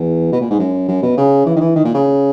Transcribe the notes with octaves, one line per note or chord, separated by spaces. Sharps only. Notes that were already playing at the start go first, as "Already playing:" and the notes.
Already playing: E2
B2
A#2
G#2
F#2
F#2
B2
C#3
E3
D#3
E3
D#3
A#2
C#3